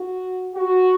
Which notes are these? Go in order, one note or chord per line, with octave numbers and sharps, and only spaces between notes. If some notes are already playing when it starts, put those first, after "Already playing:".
Already playing: F#4
F#4